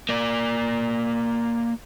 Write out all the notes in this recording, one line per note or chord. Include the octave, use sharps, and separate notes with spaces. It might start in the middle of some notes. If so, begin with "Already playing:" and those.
A#3 D5